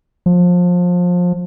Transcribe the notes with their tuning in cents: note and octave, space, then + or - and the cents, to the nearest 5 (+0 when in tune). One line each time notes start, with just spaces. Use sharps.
F3 +25